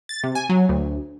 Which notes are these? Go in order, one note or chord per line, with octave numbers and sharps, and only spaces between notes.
A6
C3
G#5
F#3
D2